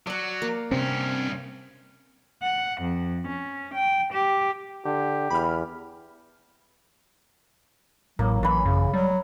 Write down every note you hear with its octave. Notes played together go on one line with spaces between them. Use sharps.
F#3 D5 F#5
A#3
G2 C3 C4 C#4
F#5
F2
C#4
G5
G4
D3 G4
E2 B5 F6
A1 A2 F#3 A#3
E3 C#5 B5
F#2 C#3
F#3 G3